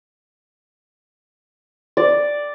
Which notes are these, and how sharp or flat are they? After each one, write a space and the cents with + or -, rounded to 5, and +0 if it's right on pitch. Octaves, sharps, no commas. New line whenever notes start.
D5 +0